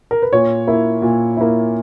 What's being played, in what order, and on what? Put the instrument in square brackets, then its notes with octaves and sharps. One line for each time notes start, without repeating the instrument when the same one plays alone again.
[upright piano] A#4
B4
A#2 C#5
A#3 E4
A#2
A#3 E4